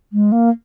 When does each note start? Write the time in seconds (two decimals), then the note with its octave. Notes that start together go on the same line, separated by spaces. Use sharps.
0.13 G#3
0.32 A#3